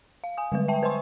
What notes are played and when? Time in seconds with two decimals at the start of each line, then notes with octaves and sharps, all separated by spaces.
0.24 F5
0.37 G#5 D#6
0.52 D3 G3 G#3 B4
0.68 E5 G5 A5
0.83 B4 C5 E5 G#5 C6 C#6